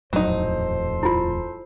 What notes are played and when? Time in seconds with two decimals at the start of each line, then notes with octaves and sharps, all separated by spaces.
0.13 D#1 F2 A2 F#3 D#4 A4 C5
1.03 E4 F4